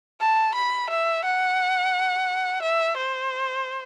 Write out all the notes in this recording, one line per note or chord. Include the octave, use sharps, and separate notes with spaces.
A5
B5
E5
F#5
E5
C5